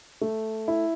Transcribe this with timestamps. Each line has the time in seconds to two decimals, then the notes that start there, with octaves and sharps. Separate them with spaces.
0.21 A3
0.68 E4